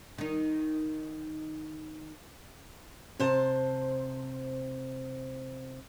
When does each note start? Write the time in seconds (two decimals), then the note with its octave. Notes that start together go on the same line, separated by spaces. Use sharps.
0.18 D#3 D#4
3.19 C3 C5 A5